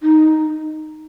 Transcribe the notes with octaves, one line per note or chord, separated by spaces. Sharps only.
D#4